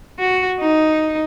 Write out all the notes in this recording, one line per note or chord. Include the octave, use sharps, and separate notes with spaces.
F#4
D#4